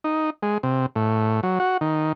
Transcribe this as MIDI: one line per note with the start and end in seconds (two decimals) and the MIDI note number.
0.04 0.30 63
0.43 0.58 56
0.63 0.86 48
0.96 1.40 45
1.43 1.59 54
1.60 1.77 66
1.81 2.12 51